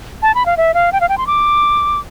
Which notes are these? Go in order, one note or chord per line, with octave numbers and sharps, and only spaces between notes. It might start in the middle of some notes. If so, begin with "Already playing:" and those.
A5
B5
F5
E5
F5
G5
F5
G5
C6
D6